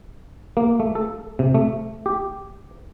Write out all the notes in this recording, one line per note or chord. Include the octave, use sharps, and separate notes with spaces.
A#3
A3
A4
C3
A3
G4